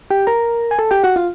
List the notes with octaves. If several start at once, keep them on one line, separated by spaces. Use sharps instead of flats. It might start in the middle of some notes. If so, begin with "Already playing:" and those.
G4 G5
A#4 A#5
G#5
A4 A5
G4 G5
F#4 F#5
F4 F5